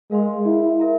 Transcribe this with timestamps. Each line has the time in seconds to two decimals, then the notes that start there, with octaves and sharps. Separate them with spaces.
0.11 G#3 A#4 F5 C6
0.45 E4
0.80 A#4 E5 A#5